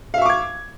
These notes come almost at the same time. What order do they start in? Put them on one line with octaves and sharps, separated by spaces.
F5 E5 C#6 D6 G#6